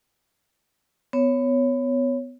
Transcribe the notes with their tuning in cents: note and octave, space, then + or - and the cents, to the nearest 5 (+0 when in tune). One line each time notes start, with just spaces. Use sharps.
B3 +25 C#5 +0